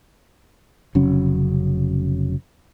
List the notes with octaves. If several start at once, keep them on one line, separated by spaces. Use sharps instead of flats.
F1 C#3 F#3 C#4